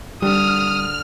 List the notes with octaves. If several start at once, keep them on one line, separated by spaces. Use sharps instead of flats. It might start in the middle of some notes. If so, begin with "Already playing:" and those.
D3 G3 D#6 F6